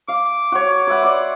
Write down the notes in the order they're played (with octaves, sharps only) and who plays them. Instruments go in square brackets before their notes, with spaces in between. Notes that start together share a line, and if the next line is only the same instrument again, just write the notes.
[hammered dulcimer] F5 [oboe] D6
[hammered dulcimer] F#4 C#5
B4 E5 F#5
D5 C6